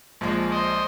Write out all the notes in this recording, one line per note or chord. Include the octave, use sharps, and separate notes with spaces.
A#1 F3 G#3
C5 D#5